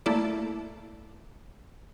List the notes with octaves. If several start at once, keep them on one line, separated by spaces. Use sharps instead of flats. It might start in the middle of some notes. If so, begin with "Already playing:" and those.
A3 A#3 E4 A4 D5